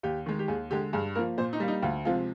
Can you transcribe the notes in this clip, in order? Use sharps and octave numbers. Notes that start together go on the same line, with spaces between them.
D#2 G4
D#3 G#3
G4
D#2 G#4
D3 G#3 G4
G2 G#4
F3 A#3 A#4
A#2 C5
D#4
G3 A#3
D#4
D2 F4
C3 F3 G#3 F4